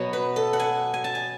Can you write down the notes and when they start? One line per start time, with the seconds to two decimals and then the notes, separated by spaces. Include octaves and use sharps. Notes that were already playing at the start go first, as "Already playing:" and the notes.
Already playing: B2 F#3 B3 C#5
0.13 B4
0.36 A4
0.53 F#5
0.59 G#5
0.94 G#5
1.04 A5
1.15 G#5